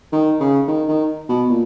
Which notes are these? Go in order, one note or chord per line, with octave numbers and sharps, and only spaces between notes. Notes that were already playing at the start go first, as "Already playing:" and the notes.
D#3
C#3
D#3
D#3
B2
A#2